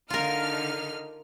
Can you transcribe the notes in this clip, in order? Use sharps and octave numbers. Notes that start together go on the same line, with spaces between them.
D3 D#4 F4 A#4 F6